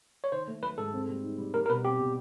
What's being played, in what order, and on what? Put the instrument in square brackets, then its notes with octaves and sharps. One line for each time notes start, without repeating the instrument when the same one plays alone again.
[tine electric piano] C#5
[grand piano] D#3 [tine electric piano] C5
[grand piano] A3
[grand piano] F#3 [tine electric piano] B4
[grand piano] G#2 [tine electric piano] A4
[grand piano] C4
G3
D#4
G3
[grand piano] G3 [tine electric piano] A#4
[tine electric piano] A#4
[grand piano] B2 [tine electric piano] B4
[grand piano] C4 [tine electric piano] G4
[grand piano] B2